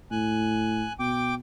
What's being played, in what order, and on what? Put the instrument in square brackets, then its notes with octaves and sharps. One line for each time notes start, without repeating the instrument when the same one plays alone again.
[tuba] A2 [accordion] G#5 F#6
[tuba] B2 [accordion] G5 D6